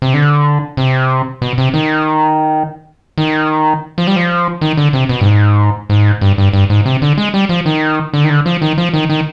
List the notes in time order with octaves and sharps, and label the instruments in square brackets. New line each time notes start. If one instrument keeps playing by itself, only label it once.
[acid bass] C3
D3
C3
B2
C3
D#3
D#3
F3
G3
F3
D#3
D3
C3
B2
G2
G#2
G#2
G2
G2
G2
G#2
C3
D3
G#3
G3
F3
D#3
D3
D#3
D3
F3
D#3
F3
D#3
D#3